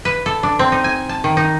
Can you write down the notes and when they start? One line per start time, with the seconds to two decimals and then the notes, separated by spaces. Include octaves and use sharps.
0.05 B4
0.26 A4
0.43 D4
0.59 C4
0.72 D#4
0.84 G#5
1.09 A5
1.24 D#3
1.37 D#4